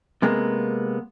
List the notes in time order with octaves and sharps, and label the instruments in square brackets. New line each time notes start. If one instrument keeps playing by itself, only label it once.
[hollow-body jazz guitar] C3 G#3 A#3 B3